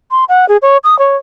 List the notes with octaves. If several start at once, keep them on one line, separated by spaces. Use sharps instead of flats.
C6
F#5
G#4
C#5
D#6
C#5